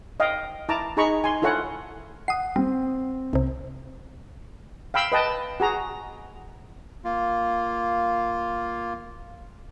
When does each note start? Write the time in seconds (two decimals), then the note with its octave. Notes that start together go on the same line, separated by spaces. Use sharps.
0.20 D#5 F5 G5
0.69 E4 A5 A#5 D6
0.97 D#4 G#4 A#5 B5 C#6
1.24 G#5 C6
1.42 E4 F4 A4 C#5 F#5 G#5
2.28 F#5 D#6 C7
2.56 G3 C4
3.33 C2 C3
4.94 F5 G5 B5 E6
5.12 B4 D#5 G5 A5
5.60 F#4 G#4 A#5
7.04 A#3 F4